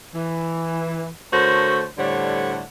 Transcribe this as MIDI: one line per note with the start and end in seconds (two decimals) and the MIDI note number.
0.15 1.08 52
1.32 1.85 50
1.32 1.85 57
1.32 1.85 66
1.32 1.85 70
1.32 1.85 72
1.32 1.85 73
1.98 2.62 45
1.98 2.62 50
1.98 2.62 55
1.98 2.62 72
1.98 2.62 73
1.98 2.62 78